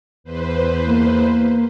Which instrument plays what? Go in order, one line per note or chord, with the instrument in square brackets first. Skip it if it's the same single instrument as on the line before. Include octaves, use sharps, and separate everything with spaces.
[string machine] E2 B4 C5
[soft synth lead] A#3